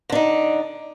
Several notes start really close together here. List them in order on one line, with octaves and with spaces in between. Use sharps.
D3 D4 D#4